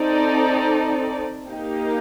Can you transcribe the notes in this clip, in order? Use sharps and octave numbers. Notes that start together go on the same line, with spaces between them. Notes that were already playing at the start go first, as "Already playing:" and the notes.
Already playing: C4 D#4 A4 D5
A#3 D#4 G4